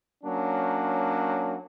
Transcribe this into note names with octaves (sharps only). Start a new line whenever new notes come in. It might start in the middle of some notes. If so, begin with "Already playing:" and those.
F#3 A#3 C#4 D4